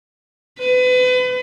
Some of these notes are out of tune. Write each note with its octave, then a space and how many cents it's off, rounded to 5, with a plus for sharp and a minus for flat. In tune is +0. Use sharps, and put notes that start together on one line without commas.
B4 +35